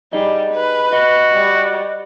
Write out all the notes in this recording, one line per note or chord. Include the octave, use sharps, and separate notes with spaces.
G3 D#4 G#4 D#5
B4
F#4 D#5
G3